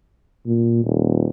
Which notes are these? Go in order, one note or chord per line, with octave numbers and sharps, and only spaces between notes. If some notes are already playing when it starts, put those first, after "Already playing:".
A#2
D#1